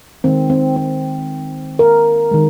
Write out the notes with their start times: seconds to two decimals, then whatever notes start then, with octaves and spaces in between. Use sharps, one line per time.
0.24 D#3 G#3 C4
0.50 C4
0.76 C4
1.79 A#4
2.31 D#3 G#3